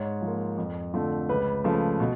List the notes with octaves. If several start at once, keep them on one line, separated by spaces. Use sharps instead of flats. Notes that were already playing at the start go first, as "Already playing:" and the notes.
Already playing: G#2 C#5
F3
A#3
F2
D3 F3 A3 C4
C#2 B4
C#3 F3 A3
B2